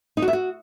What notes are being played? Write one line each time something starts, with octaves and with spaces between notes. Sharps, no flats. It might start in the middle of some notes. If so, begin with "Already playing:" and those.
D#4
F#4
E5
F#4